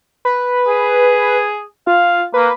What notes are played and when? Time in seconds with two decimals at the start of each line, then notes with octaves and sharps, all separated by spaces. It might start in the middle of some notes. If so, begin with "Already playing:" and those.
0.25 B4
0.68 G#4
1.87 F4 F5
2.34 A#3 B4